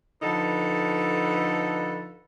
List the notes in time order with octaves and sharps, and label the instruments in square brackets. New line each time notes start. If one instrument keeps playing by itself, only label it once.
[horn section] D3 F3 D#4 A4 B4